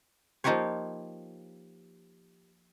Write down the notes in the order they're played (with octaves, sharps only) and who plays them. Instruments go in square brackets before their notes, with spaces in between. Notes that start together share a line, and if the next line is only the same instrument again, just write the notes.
[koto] F3 A#3 D#4 F4 G4 C#5